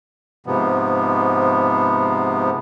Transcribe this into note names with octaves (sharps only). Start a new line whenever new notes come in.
G#2 C3 F3 B3